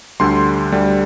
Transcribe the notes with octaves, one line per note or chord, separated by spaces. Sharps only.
D2 D3 G3 C6
D2 D3 G3